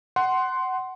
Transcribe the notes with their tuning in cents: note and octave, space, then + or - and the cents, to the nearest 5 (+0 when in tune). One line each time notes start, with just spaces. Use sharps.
F#5 +15 C6 +0